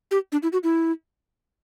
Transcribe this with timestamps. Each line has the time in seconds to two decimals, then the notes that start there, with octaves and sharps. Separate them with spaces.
0.11 G4
0.32 D4
0.43 E4
0.53 F#4
0.63 E4